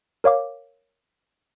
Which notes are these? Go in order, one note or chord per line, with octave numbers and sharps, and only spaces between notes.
A#4 C#5 F5 D6